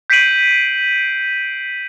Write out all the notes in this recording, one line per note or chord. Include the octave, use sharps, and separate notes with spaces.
G6 B6 C7 D7 D#7 F#7